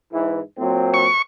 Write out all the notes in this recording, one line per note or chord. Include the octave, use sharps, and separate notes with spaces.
G#2 E3
A#2 F#3 C4
C#6